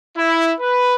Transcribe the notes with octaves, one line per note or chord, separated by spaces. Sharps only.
E4
B4